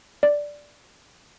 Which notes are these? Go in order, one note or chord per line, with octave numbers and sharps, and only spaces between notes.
D5